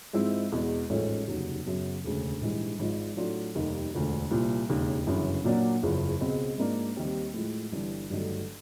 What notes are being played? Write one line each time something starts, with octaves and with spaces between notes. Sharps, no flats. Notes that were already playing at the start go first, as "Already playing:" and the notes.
G#2 F3 G#3 C4 E4
E2 B2 G#3
A1 G#2 F3 A3 C#4
F1 D#2 C#3 F#3
F#2 C#3 F#3 B3
E1 D2 C#3
A#1 G#2 E3 G3
G#1 G#2 F3
A2 F#3 A3 D4 F4
F1 D#2 D#3 G3 A#3
E1 D2 D3 F3
C2 A#2 F3
E1 D#2 C#3
G1 F#2 C#3 E3
A#2 F#3 A#3 D4 F#4
F#1 E2 C#3 F3
C#2 B2 G#3 C4
G#2 F3 A#3 D4
D#2 D#3 G3 C4
A2 F3 G#3
G1 G2 E3
G1 G2 D#3 F#3 A3